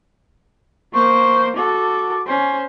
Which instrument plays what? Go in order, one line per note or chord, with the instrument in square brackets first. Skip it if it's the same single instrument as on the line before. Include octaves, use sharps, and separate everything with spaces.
[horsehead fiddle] A#3 C5 [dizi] C#6
[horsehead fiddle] F#4 A4 [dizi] D6
[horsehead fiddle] C#4 C5